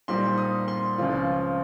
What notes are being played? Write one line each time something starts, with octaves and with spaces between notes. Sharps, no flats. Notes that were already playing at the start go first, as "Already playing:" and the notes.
A#2 G3 C4 D#4 C6
D#6
C6
C#2 C#3 F3 C4 F4